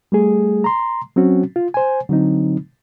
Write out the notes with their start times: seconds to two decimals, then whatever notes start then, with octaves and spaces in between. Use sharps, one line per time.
0.12 G3 A3 G#4
0.64 A#5 C6
1.16 F#3 C4 C#4 F#4
1.56 F4
1.74 C5 G#5
2.09 D3 F#3 C4 D#4